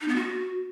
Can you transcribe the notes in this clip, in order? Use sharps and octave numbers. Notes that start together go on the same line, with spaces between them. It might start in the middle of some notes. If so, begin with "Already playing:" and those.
D#4
B3
F#4